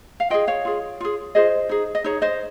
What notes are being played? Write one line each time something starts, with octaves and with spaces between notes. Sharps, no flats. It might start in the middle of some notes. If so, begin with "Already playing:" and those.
F5
F4 G#4 D#5 G5
C#5 F5
F4 G#4
F4 G#4
F4 G#4 C5 D#5
D#4 G#4
D#5
D#4 G#4 C#5
C5 D#5